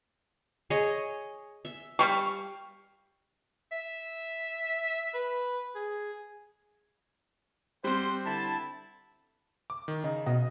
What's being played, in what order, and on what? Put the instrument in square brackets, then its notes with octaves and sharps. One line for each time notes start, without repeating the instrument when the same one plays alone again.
[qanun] G#4 C#5 D#5
E5
[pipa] G3 C#6 [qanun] F5
[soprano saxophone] E5
B4
G#4
[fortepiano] G3 C4 [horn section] C5 F#5
[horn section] D3 E4 A5
[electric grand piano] D6
D#3
[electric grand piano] C#3 [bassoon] D#4
[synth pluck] B2 [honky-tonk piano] D#5